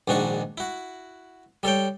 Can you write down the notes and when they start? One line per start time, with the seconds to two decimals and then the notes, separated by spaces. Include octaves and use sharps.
0.08 A#1 G#2 D#3 D4 F#4 C#6
0.58 E4 F#4
1.63 G3 A4 C#5 G5